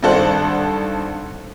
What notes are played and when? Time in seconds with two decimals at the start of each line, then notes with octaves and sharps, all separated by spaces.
0.03 G#1 G2 A4 C5 F#5 F#6